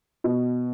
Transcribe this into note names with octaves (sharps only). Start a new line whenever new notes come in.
B2